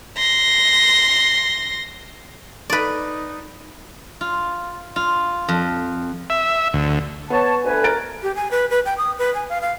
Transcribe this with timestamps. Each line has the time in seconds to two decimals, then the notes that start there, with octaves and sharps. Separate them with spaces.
0.18 C6 A#6
2.70 D#4 B4 D5
4.21 F4
4.96 F4
5.48 F2
6.30 E5
6.74 D2
7.30 B3 C#5 A5
7.64 D2 B4 G#5
7.84 A#4 A6 D7
8.23 G4
8.36 G#5
8.51 B4
8.70 B4
8.85 G5
8.98 D#6
9.18 B4
9.35 G#5
9.49 F5
9.62 F5